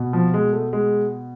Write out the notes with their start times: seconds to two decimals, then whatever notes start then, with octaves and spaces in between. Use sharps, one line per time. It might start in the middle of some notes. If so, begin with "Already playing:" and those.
Already playing: B2
0.13 F3
0.34 G#3
0.53 A3
0.73 G#3